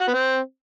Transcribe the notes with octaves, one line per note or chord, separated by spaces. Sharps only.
F#4
B3
C4